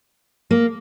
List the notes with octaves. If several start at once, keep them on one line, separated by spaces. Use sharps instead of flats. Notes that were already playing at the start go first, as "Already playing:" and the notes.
A#3